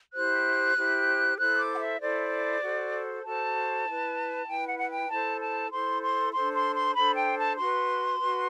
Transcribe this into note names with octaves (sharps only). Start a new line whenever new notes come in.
E4 G4 C5 F#6
E4 G4 C5
E4 A4 C5 F#6
E6
D6
F#5
E5
E4 A4 C5 D5
F#4 A4 C5
F#4 A4 C5 A5
E4 B4
E4 B4 G5
F#5
F#5
G5
E4 A4 C5 A5
A5
E4 A4 C5 C6
C6
D4 A4 C5 C6
C6
C6
D4 A4 C5 B5
G5
A5
F#4 B4 C6
F#4 B4